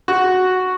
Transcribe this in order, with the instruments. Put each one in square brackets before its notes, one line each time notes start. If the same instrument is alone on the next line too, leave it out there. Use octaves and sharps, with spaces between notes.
[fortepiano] F#4